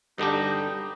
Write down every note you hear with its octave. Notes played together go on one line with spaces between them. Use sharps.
G2 D3 G3 D4 D#4 G4